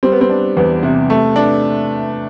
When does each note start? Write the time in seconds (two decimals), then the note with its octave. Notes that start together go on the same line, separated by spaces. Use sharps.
0.03 G3 C4
0.12 B3
0.21 C4
0.29 D4
0.57 E2 B3
0.83 C3
1.10 A3
1.36 D4